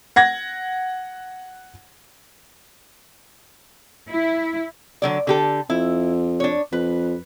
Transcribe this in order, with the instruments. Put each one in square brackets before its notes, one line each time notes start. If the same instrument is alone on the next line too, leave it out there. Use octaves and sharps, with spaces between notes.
[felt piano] F#5 G#6 A#6
[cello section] E4
[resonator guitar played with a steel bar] D3 F#3 D5
D3 G4 A4
[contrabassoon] F2 [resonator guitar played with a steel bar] E4
[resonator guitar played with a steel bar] D4 C#5
[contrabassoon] F2 [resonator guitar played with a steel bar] B4